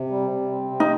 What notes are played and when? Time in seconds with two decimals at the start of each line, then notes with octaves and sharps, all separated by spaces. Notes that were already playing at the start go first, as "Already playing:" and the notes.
Already playing: C3
0.10 G3
0.31 C3
0.51 C4
0.70 C3
0.80 D#4